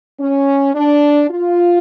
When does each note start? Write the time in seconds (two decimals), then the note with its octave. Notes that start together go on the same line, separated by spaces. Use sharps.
0.20 C#4
0.75 D4
1.31 F4